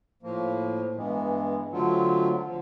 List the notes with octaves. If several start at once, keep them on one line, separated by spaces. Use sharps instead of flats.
A2 F3 A#3
G2 E3 G#3 B3
D3 F#3 A3 C4 F4
D3 F3